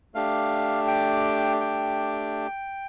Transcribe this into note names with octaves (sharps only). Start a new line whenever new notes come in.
A3 D4 G4 F5
G5
G5